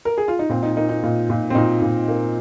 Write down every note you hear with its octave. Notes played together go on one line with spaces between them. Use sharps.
A#4
G#4
F4
D#4
A#2 C4
D#4
A#3 D#4
D#4
A#2
A#2
C4
A#2 D#4
A#2
A#3